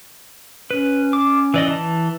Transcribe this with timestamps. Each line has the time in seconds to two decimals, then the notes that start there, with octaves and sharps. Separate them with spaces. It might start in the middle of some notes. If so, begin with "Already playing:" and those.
0.70 C#4 B4
1.13 D6
1.54 E3 D5 D#5
1.68 E3 A5